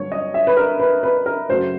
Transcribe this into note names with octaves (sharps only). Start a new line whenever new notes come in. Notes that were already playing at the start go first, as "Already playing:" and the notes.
Already playing: G2 D3 F#3 C#5
D#5
E5
B4
A#4
B4
B4
A#4
F#2 C#3 F#3 A3 C#4 C5